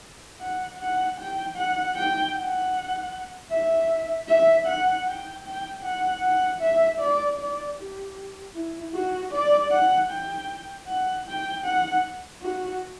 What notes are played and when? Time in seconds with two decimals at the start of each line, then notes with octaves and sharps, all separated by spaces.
0.40 F#5
0.79 F#5
1.18 G5
1.56 F#5
1.95 G5
2.34 F#5
3.51 E5
4.28 E5
4.66 F#5
5.06 G5
5.45 G5
5.82 F#5
6.22 F#5
6.61 E5
6.99 D5
7.38 D5
7.77 G4
8.54 E4
8.94 F#4
9.32 D5
9.71 F#5
10.10 G5
10.87 F#5
11.26 G5
11.65 F#5
12.42 F#4